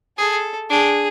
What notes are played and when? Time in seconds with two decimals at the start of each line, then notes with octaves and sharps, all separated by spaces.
0.18 G#4 A4
0.70 D4 G#4